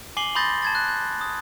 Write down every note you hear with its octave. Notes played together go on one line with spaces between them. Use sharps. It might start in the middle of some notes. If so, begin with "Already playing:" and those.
G#5 D6 C7 F#7 G7
B5 C6 D#6 G6 A6 A#6
A5 G#6 A6
F#6 G#6
G6
D#6